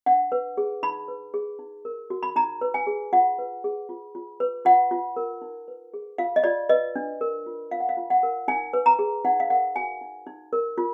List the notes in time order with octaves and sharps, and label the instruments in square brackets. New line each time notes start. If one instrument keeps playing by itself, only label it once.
[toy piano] D4 F#5
B4
G#4
D#4 B5
B4
G#4
D#4
A#4
F#4
B5
D#4 A#5
B4
G#5
G#4
F4 F#5
B4
G#4
F4
F4
B4
F4 F#5
F4
A#4
D#4
B4
G#4
F4 F5
D#5
F4 D5
B4 D#5
D4
A#4
F4
F4 F5
F#5
F5
F4
F#5
A#4
D#4 G#5
B4
A#5
G#4
D#4 F#5
F5
A#4 F#5
F#4 G#5
D#4
D#4
A#4
F4